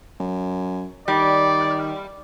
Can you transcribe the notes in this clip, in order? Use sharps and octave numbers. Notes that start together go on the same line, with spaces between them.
F#2
D#3 G3 D5